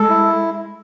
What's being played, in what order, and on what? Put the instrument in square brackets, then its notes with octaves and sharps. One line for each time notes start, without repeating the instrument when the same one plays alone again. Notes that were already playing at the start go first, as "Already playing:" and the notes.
Already playing: [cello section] G#3 [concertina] A4
[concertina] E4